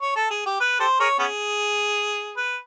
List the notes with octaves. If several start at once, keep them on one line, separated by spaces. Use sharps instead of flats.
C#5
A4
G#4
G4
B4
G4 A4 C5
G#4 A#4 C#5
B3 C#4 G#4
B4